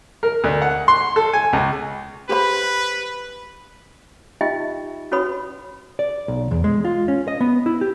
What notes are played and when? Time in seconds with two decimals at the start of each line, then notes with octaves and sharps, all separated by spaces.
0.23 A#4
0.44 D2
0.62 F#5
0.88 C6
1.16 A4
1.33 G#5
1.53 C#2
2.29 G4 B4 C5 B5
4.41 D#4 F4 G4 D#5 E5 G5
5.12 C#4 F#4 B4 C#5 B5 D#6
5.99 D5
6.28 B1
6.51 E2
6.64 G#3
6.85 F4
7.08 C#4
7.28 D#5
7.41 B3
7.66 E4
7.81 G4